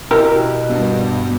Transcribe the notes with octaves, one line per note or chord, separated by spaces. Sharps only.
B2 E4 G4 A#4
G2 B3